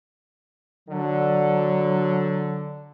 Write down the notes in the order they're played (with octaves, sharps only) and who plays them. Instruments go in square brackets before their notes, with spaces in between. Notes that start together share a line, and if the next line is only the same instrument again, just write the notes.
[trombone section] D3 [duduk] F#3